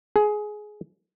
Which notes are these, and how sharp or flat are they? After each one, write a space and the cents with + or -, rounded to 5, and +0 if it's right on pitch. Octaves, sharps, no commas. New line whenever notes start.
G#4 +15